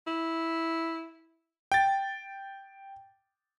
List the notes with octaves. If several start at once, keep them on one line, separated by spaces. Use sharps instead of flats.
E4
G5 A6